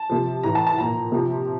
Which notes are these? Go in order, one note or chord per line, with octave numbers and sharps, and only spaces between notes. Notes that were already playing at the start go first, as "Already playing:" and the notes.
Already playing: A5
C3 F3
A2 E3 A#5
A5
A5
A#2 F3 A#5
C3 F3